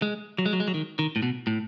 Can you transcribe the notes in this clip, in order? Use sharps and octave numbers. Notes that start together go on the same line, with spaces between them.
G#3
F#3
G#3
F#3
G#3
F#3
D#3
D#3
A2
B2
A2